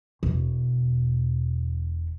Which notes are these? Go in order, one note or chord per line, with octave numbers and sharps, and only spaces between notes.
E1 B2